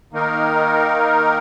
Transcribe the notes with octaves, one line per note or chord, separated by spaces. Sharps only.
D#3 A#3 D#4 A#4